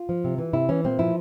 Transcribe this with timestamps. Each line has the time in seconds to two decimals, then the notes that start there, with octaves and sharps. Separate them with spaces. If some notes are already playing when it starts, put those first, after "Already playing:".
Already playing: F4
0.09 F3
0.24 C3
0.38 E3
0.53 C3 E4
0.69 E3 C#4
0.84 A#2 C4
0.99 F3 E4